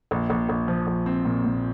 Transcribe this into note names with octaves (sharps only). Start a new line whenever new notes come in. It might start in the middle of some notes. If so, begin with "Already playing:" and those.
A#1
A#1
A#1
F3
A#1
C4
A#2
A#2